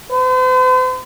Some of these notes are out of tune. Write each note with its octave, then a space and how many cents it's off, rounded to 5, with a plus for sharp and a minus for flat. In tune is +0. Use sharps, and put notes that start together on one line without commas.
C5 -45